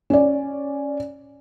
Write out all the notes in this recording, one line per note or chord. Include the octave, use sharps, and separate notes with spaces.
C#4 D5